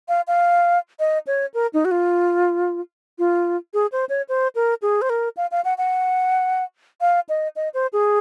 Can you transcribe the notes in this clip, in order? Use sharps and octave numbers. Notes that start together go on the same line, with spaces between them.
F5
F5
D#5
C#5
A#4
D#4
F#4
F4
F4
G#4
C5
C#5
C5
A#4
G#4
C5
A#4
F5
F5
F#5
F#5
F5
D#5
D#5
C5
G#4